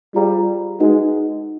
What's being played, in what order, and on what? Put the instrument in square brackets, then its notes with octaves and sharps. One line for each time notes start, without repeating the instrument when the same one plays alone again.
[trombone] G3 [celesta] F4 G#4 C5 F5 A#5
[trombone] G#3 [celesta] D#4 F#4 B4 D#5 F#5